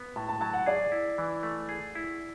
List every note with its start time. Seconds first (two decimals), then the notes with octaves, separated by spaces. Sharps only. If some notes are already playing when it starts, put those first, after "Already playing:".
Already playing: B3
0.16 A2 A5
0.29 A5
0.41 F#3 A5
0.53 F#5
0.66 G#4 D5
0.92 E4
1.18 E3
1.43 A3
1.69 G#4
1.95 E4